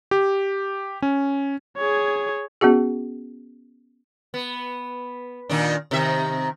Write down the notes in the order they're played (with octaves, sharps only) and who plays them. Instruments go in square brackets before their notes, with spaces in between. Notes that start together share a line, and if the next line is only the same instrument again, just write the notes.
[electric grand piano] G4
C#4
[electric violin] G#4 C#5
[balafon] B3 C#4 F#4 G#4
[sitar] B3
A#2 D#3 D4
C3 D#3 E5